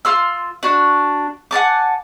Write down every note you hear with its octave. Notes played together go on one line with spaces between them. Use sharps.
F4 C6 E6
D4 F#4
F#5 G#5 A5 D6